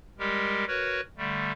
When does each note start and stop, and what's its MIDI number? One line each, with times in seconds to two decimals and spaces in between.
0.19 0.65 55
0.19 0.65 56
0.19 0.65 67
0.19 0.65 70
0.67 1.01 66
0.67 1.01 70
0.67 1.01 71
0.67 1.01 73
1.17 1.52 50
1.17 1.52 55
1.17 1.52 57